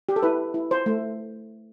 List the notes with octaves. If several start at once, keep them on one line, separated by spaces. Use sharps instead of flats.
G4
A4
E4 B4
E4
C5
A3